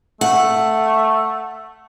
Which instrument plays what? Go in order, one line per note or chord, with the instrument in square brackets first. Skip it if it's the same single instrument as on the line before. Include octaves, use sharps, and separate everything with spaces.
[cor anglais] A3 [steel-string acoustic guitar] F#5